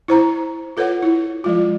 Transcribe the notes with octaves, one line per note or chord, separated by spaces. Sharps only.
E4 C5 A#5
F4 A4 B4 C#5 F#5
E4
F3 G#3 F4